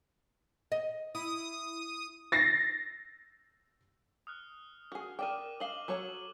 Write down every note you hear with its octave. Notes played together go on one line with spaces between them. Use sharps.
D#5
E4 D#6
A6 A#6 C7
D#6 F6 F#6
F#4 G#4
A#4 D5 G5 D6 D#7
D#5 F5 F#7 G7
F#3 A4 C#5